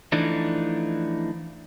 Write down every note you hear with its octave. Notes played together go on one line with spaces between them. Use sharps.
E3 F3 A3 D4 D#4